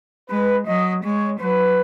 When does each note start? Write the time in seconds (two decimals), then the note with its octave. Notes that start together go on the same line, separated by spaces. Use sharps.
0.30 G#3 B4
0.67 F#3 D#5
1.04 G#3 C#5
1.40 F#3 B4